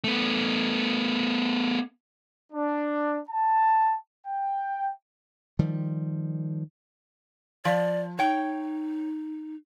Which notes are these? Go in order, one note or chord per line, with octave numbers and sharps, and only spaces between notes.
A3 B3
D4
A5
G5
D#3 F3 G3
F3 D5
D#4 C#5 G5